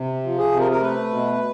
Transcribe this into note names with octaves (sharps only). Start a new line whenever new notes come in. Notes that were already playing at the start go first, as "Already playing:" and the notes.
Already playing: C3
F3
G#4
C3
A#4
A#4
A3 B4
B2